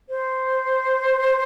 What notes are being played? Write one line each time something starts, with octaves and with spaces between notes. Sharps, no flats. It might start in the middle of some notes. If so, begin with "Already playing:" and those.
C5